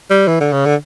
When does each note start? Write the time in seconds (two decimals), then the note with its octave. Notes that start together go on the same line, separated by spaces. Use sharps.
0.10 G3
0.28 E3
0.40 D3
0.52 C#3
0.66 D3